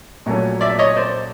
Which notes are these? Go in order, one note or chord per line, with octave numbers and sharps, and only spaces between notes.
A#1 A#2 F#3 A3 C#4
D5 E5
C#5 D#5
C5 D5